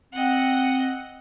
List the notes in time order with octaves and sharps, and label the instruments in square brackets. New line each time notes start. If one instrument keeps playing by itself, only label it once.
[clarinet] C4 [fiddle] D#5 F#5